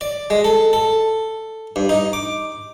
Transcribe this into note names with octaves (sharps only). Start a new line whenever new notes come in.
D5
G#3
A4
A4
G2
D#4
D6